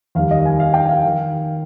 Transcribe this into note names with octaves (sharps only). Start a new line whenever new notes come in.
D#2 D#3 G3 F5
D#5
G#5
F5
G5
F5
D#3